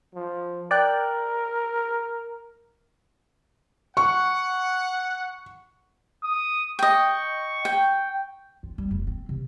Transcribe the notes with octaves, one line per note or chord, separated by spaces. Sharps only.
F3
A#4 D5 G5 F#6
F#5 C#6
D#6
D#5 G5 C#6
G5
F4
G3
F1
C4
C3